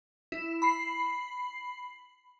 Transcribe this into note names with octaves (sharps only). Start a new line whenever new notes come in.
E4
B5 C7